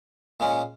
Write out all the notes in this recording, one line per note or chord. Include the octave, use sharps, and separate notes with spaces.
A#2 G#3 C#4